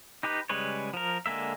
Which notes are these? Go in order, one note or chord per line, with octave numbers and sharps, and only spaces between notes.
D#4 G4 B4
C#3 G3 G#3 B4 C#5
F3 A#4
D3 G#3 A#3 E5